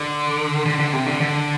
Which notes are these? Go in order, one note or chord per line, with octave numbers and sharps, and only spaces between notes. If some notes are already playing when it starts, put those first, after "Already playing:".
Already playing: D3
D3
D3
C3
D3
D3